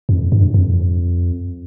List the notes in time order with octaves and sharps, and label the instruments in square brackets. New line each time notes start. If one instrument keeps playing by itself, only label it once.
[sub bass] F2
G2
F2